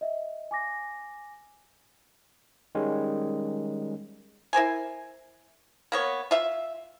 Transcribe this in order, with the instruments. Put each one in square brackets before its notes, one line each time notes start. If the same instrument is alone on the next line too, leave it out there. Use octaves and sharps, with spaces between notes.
[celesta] D#5 E5
G#5 D6 A#6
[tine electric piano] D#3 G3 G#3 C#4
[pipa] E4 A#4 C5 G#5
A#3 B3 C#5
F4 E5